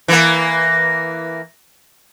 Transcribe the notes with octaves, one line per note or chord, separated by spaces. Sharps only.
E3 A#3